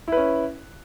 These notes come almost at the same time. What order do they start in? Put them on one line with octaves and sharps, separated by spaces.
E4 B4 C#4